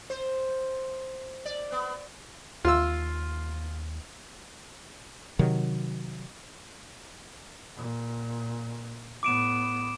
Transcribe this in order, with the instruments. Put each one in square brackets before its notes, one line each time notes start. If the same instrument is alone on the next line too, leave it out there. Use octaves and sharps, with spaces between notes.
[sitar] C5
D5
B3
[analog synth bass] D#2 [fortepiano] F4 E6
[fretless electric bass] C3 D#3 F#3
[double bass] A#2
[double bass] A2 B3 [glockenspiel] D6 D7 E7